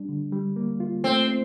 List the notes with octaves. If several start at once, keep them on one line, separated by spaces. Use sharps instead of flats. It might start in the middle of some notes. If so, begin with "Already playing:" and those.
Already playing: G3 D4
D3
G3
A#3
F4
A3 C4
C4